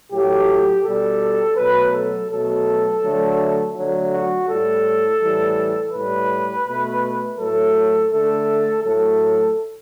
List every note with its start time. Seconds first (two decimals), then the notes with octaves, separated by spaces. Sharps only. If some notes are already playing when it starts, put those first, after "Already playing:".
0.11 A2 F#3 A3 G4
0.83 B2 G3 A4
1.56 B2 F#3 A3 B4
1.93 A4
2.30 B2 F#3 A3 A4
3.02 D3 F#3 A3
3.75 D3 F#3 A3
4.12 F#4
4.47 A2 G3 A4
5.21 A2 E3 G3
5.92 A2 G3 B4
6.65 B2 A3
7.38 A2 F#3 A3 A4
8.11 D3 A3 A4
8.83 A2 F#3 A3 A4